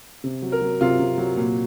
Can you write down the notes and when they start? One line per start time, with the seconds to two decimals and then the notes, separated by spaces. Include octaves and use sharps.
0.24 C3
0.42 F#3
0.52 A#4
0.61 F#3
0.81 C3 F4
0.99 C3
1.18 F#3
1.37 A#2